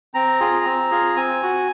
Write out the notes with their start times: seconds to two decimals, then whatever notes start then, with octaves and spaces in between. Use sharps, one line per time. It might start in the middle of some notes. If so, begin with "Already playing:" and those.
0.14 C4 A#5
0.40 F4 G#4
0.65 C4
0.91 F4 G#4
1.16 C4 G#5
1.42 F#4